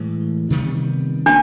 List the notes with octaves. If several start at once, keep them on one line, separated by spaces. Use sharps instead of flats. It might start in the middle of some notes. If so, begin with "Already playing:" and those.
Already playing: A2 E3 G#3
C3 D#3 G3 B3
A#3 C#4 D4